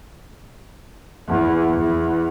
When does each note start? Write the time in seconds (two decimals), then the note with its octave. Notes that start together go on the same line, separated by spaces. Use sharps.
1.28 E2
1.74 E2